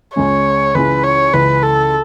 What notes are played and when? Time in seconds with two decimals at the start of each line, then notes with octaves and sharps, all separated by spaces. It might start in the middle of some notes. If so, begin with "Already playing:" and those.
0.16 C#2 C#3 G#3 C#4 C#5
0.75 C#2 C#3 E3 B4
1.04 C#5
1.33 C#2 C#3 E3 B4
1.63 A4